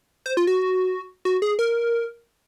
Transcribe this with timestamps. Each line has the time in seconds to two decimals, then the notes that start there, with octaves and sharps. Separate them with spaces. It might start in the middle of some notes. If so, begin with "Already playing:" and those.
0.26 C5
0.37 F4
0.47 F#4
1.25 F#4
1.42 G#4
1.59 A#4